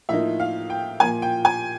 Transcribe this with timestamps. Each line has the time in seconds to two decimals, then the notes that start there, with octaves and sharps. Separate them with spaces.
0.09 A2 F3 A#3 D#4 E5
0.40 F5
0.70 G5
1.00 A#2 F3 A#3 G#5
1.22 G5
1.45 G#5